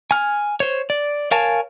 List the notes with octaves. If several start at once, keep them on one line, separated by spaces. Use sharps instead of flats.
G#5 F6
C5 C#5
D5
A#4 C#5 F5 G#5 A5